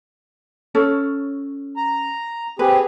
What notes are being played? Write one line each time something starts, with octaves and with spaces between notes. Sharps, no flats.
C#4 A4 C#5
A#5
C4 G4 G#4 B4